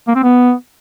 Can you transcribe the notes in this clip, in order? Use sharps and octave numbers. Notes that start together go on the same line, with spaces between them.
A#3
C4
B3